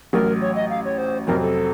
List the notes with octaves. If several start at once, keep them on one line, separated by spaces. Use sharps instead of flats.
A1 A2 F#3 A#4
C#5
D#5
F5
C#5
C5
F2 C3 F#3 C4 A#4
A4